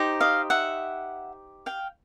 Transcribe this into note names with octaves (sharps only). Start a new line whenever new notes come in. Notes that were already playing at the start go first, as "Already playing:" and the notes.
Already playing: D#4 G4 C5
D#5 F5
E5 F#5
F5 G5